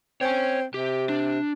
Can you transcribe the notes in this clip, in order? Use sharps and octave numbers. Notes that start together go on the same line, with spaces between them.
C4 C#5 G#5
C3 G4
D4